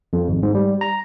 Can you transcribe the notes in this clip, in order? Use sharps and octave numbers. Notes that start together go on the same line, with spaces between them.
F2
G#1
G#2
G3
A#5